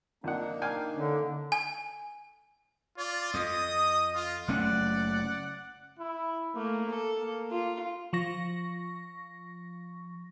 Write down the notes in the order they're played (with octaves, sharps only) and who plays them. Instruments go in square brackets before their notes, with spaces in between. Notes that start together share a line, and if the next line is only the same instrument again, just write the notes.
[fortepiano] F2 F#5 [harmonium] A#3 D4 D#4
[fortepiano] F5 G5 G#5
[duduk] D3 [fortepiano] C#4
[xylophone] G#5
[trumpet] F4 [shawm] D5
[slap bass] F2 [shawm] D#5 [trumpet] D#6
[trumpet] F4
[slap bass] F#1 A3 C#4 [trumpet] D5 [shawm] F#5
[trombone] E4
[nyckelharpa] A3 [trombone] A#3
[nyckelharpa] A4
[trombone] A#3
[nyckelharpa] F4
[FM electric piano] F3 C#6 A#6